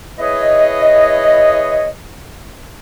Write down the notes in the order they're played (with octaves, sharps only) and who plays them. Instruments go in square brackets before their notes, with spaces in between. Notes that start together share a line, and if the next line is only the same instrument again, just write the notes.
[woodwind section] E4 G#4 B4 C#5 D#5